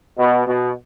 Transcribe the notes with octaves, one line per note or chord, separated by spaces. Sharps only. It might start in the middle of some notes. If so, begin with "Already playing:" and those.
B2
B2